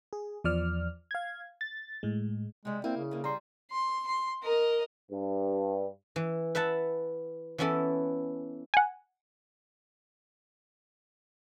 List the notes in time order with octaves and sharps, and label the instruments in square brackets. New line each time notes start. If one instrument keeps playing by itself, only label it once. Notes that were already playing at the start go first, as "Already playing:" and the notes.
[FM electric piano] G#4
E2 F3 D5 F6
F5 G#6
A6
A2 G#3
[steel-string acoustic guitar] C3 G3 [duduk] G#3
[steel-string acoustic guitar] A#3 [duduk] C4 [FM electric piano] E4
[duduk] C#3
[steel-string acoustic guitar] D3 A#3
[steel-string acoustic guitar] G3 [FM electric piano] A#5 C6
[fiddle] C6
C6
A#4 D#5
[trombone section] G2
[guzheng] E3
B4 E5 F#5 A5
E3 B3 C#4 E4 A4
[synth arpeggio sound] F#5 G#5